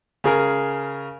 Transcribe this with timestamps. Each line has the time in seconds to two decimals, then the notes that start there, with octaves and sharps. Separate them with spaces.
0.24 C#3 G#4 A#4